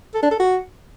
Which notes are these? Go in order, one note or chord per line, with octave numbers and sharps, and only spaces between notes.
A4
D4
A4
F#4